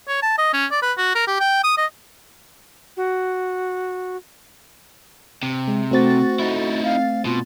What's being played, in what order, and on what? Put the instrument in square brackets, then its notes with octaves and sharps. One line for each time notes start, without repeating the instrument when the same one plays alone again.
[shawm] C#5
A5
D#5
C#4
D5
B4
F#4
A#4
G4
G5
D#6
D#5
[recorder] F#4
[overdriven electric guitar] C3
[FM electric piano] G#3
[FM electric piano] A3 C4 A6 [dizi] F#4
[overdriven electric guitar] D#4 E4
[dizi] F5
[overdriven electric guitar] B2 [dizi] F4